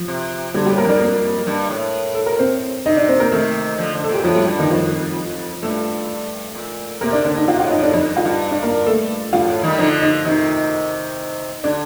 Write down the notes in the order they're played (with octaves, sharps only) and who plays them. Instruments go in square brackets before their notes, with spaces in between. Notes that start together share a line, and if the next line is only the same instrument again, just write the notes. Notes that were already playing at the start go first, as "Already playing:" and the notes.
Already playing: [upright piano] F3
[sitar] C3
[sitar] D3 [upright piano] G3 G4
[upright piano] G3 G4
[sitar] A2
[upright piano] A#3 A#4
[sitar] F2 [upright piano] D4 D5
[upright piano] A#3 A#4
[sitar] G2
A2
[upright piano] A4
A#4
C4 C5
[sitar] C3 [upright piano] D#4 D#5
[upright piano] D4 D5
C4 C5
A#3 A#4
[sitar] C3 D#3 [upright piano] A3 A4
[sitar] D3 F3
D3
[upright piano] A4
[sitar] A#2
[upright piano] G4
[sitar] A2 [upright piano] F3 F4
[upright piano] G3 G4
[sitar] G2
[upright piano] D#3 D#4
[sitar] F2 [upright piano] F3 F4
[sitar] G2 [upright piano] A3 A4
[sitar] A#2
[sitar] C3 [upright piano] A#3 A#4
[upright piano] D4 D5
[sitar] D3 [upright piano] D4 D5
[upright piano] D#4 D#5
[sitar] C3 [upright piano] F4 F5
[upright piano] F4 F5
[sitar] A2
[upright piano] D#4 D#5
[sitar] A2 [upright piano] D4 D5
[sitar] F2 [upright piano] D#4 D#5
[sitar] G2
[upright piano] F4 F5
[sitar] G2
[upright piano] D4 D5
A#3 A#4
A3 A4
[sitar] G2 [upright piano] F4 F5
[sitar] A2
D#3 G3
[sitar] D3 F3 [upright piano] D#4 D#5
[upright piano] D#4 D#5
[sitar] C3 D#3 [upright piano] D#4 D#5
[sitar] D3 [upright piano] D4 D5